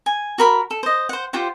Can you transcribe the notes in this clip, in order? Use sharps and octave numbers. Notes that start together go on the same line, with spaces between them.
G#5
F#4 A#4 B5
A4
C5 D#5
C5 F#5
F4 G4 C5 F#5